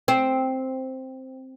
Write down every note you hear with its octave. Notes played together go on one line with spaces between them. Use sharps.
C4